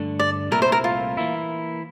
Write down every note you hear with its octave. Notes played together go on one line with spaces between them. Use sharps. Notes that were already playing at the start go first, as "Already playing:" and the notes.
Already playing: G2 D3 A3 D4
D5
C2 A#2 A3 E4 A#4
C5
A#4
F4
E3 A#3 E4